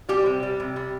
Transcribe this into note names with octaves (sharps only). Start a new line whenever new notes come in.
G3 G4
C3
G3
C3
G3